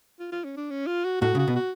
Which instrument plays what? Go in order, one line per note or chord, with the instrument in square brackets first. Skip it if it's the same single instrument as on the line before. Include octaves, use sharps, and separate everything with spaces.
[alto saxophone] F4
F4
C#4
D4
C#4
F4
F#4
[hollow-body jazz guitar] A2 [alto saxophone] F#4
[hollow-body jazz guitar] C#3
[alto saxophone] F#4
[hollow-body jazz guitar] B2
[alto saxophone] F#4